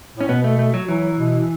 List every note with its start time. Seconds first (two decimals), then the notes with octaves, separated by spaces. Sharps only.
0.17 A2 C#4
0.28 B2 B3
0.44 A3
0.59 A3
0.74 F#3
0.88 E3 F#3
1.18 B2